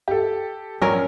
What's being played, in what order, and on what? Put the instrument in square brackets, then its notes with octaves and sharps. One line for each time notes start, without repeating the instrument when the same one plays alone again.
[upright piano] G4 A4
[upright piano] A#1 [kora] C#4 A#4